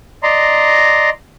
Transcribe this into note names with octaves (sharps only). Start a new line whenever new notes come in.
D5 D#5 A#5 C6